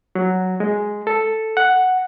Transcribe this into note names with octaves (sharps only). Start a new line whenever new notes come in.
F#3
G#3
A4
F#5